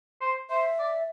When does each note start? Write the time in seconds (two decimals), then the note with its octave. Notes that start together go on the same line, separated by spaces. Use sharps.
0.21 C5
0.50 C5 E5
0.79 D5